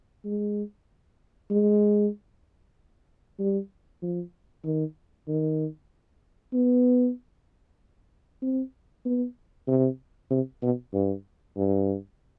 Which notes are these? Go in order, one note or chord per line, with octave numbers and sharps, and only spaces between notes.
G#3
G#3
G3
F3
D#3
D#3
B3
C4
B3
C3
C3
B2
G2
G2